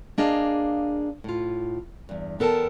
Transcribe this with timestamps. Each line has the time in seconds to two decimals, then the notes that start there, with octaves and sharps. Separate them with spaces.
0.18 A#3 D4 G#4 D#5 F5
1.24 A2 F4
2.09 E2 G2
2.39 E2 B3 A4 A#4 G5 A5